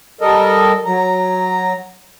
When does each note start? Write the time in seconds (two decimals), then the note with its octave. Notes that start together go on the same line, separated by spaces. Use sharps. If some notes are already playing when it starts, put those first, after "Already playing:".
0.21 G3 A4 A#4 D#5
0.85 F#3 A#5